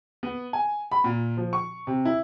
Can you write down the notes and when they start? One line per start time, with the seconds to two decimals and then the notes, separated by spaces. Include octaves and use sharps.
0.23 B3
0.53 G#5
0.91 B5
1.04 A#2
1.37 F3
1.53 C#6
1.87 C3
2.05 E4